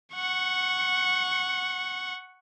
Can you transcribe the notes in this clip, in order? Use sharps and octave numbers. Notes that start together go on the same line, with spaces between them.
F#5 C#6